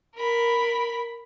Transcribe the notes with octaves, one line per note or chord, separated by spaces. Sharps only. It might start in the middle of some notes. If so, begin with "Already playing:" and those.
A#4 B5